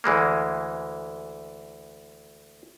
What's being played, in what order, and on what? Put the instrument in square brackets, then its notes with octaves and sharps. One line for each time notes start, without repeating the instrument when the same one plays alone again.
[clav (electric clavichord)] D2 E3 G#3 A#3